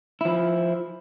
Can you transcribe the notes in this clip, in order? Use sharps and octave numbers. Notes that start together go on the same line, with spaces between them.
F3 E4